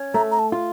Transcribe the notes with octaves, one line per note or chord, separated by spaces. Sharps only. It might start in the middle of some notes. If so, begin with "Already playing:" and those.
Already playing: C#4
A3 A#5
A#5
A5
F4